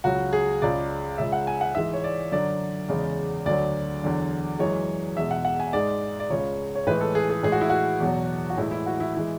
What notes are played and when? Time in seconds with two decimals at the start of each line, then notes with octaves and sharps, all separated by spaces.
0.04 C#2 C#3 F#3 F#4
0.33 G#4
0.62 C#2 C#3 G#3 D5
1.18 C#2 C#3 G#3 E5
1.32 F#5
1.47 G#5
1.61 F#5
1.75 G#2 E3 G#3 E5
1.93 C#5
2.04 D5
2.32 F#2 D3 F#3 D5
2.89 E2 C#3 G#3
3.46 D2 D3 F#3 D5
4.03 E2 D3 F#3
4.59 F#2 E3 G#3 C#5
5.16 E2 B2 G#3 E5
5.31 F#5
5.45 F#5
5.60 G#5
5.73 G#2 G#3 D5
6.20 D5
6.30 C#2 C#3 G#3 C#5
6.75 C#5
6.87 A2 E3 G#3 B4
7.01 A4
7.15 G#4
7.30 G#4
7.43 A2 E3 G#3 G#4
7.52 F#4
7.61 E4
7.69 F#4
8.00 E2 B2 F#3
8.50 F#4
8.57 A2 E3 G#3 E4
8.71 E4
8.86 F#4
9.00 E4
9.14 E3 G#3 E4